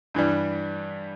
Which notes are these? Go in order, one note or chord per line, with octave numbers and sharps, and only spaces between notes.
G2 E3 G3